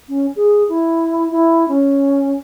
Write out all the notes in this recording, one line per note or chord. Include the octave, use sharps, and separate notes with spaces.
C#4
G#4
E4
E4
C#4